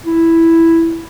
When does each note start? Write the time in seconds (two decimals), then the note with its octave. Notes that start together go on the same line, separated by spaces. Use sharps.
0.05 E4